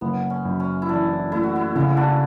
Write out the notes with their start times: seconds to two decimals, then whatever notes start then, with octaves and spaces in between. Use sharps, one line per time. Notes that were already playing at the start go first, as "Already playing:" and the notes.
0.01 F#1 B3
0.30 C#4
0.45 F#2
0.60 C#4
0.82 E4
0.89 E3 D4
1.32 A3 E4
1.43 F#4
1.56 E4
1.75 C#3 E4
1.97 D4 F#4